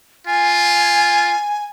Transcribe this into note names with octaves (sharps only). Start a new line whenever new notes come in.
F4 G#5